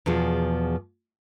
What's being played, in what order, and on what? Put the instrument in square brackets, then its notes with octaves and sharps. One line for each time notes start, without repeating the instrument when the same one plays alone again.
[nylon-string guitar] E2 B2 F3 G#4